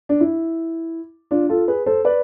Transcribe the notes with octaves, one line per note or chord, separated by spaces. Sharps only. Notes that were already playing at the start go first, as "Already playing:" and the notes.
D4
E4
D4 F4
F4 A4
G#4 B4
A4 C5
B4 D5